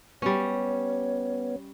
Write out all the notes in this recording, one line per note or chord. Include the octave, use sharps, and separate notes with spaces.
G3 B3 C#4 C#5